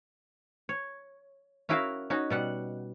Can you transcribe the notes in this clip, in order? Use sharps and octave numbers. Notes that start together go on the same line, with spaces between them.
C#5
C#4 E4 F#4 A#4 E5 F5
C#4 D#4 F#4
B2 G3 F#5